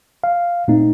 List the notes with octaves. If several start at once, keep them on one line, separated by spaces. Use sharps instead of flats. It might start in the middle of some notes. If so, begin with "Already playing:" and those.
F5
A#2 A3 C4 D#4